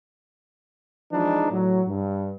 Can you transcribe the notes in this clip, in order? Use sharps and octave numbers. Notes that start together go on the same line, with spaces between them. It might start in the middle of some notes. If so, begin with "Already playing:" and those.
E3 F3 G#3 D4 D#4
A2 F#3
G2